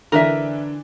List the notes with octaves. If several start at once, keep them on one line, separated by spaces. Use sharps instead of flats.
D3 E3 D4 A#4 B4 E5